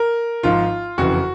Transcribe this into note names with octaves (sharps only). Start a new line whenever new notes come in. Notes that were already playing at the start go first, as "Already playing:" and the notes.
Already playing: A#4
G#1 G#2 F3 F4
F#1 F2 C#3 E3 F#4